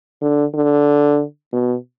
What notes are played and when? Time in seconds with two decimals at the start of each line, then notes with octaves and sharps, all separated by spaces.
0.22 D3
0.54 D3
1.53 B2